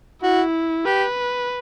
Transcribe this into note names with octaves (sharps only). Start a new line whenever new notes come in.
E4 F#4
G4 B4